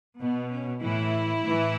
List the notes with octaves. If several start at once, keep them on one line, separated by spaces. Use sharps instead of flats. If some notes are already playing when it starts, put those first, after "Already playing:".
B2 B3
C#4
A2 E3 E4
A2 E3